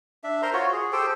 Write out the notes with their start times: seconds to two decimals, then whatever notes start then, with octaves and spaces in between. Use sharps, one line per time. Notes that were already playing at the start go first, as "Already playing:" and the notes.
0.24 D4 E5
0.42 A#4 C5 A#5 C6
0.53 F4 F#4 C#5
0.72 G#4
0.92 G4 A4 C5 G5